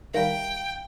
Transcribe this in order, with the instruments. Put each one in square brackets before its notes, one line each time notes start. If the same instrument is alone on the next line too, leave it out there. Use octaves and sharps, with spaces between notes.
[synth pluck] D#3 G3 [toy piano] E5 F5 A#5 [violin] G5